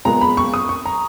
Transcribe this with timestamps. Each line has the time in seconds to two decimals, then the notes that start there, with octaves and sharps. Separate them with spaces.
0.05 A#2 G#3 B3 A#5
0.21 B5
0.37 C#6
0.54 D#6
0.69 C#6
0.86 A#5